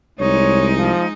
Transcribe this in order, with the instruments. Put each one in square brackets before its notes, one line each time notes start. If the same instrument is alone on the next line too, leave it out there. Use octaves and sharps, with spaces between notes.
[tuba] C2 [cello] G#3 D#4 [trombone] C#5
[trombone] F3